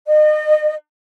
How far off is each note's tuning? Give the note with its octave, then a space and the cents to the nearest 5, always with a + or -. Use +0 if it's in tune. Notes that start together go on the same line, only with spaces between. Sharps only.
D#5 -35